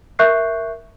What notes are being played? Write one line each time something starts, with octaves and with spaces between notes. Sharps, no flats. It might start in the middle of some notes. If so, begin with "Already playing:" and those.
A#4 E5 C#6 F#6 G6 C7